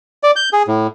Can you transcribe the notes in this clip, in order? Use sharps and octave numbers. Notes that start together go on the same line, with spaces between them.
D5
G6
G#4
A2